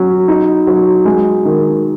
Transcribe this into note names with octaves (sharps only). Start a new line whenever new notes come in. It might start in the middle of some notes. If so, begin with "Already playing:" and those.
Already playing: F#3 C#4
D#4
F#3
G#3
D#3